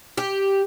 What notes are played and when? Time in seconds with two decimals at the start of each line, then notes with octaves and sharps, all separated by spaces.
0.17 G4